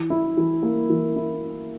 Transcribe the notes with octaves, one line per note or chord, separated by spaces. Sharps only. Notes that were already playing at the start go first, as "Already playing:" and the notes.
Already playing: E3
E4
E3
A#3
E3
E4